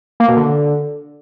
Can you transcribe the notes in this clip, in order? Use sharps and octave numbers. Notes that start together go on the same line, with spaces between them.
A#3
B2
D3